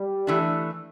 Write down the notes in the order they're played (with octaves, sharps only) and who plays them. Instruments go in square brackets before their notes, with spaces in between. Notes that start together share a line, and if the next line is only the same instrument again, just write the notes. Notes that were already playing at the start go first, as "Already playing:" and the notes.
Already playing: [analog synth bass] G3
[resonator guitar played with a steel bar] E3 A3 D4